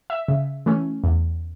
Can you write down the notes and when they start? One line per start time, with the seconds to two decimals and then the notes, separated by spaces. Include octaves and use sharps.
0.10 E5
0.28 C#3
0.66 E3 A3 C#4
1.04 E2